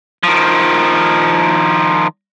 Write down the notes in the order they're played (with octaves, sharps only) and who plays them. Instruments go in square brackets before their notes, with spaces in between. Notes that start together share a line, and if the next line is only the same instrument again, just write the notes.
[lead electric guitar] D#3 F3